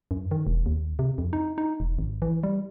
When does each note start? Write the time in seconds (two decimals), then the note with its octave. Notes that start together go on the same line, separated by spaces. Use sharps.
0.11 F#2
0.31 D#3
0.47 E1
0.66 D#2
0.99 C3
1.18 F2
1.33 D#4
1.58 D#4
1.80 E1
1.99 G#1
2.22 E3
2.43 G3